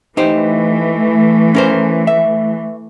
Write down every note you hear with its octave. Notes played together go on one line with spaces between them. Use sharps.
E3 A3 D#4 G4 C5
C#4 A#4 C5
E5